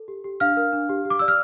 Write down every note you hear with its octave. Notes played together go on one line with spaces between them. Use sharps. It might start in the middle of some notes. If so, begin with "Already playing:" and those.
Already playing: A4
G4
G4
D4 F5 F6
A#4
D4
G4
G4
D6
D5 E6
F6